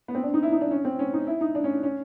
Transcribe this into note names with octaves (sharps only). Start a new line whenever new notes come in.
B3
C4
D4
D#4
E4
D#4
D4
C#4
C4
C#4
D#4
E4
D#4
D4
C#4
C#4